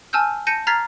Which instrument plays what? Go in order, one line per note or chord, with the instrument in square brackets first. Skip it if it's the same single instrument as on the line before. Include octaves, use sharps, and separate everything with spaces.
[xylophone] G#5 A5 E6 F6 G6
A5 G6 A#6 C#7 D#7
A#5 F6 G#6 A6 B6 C7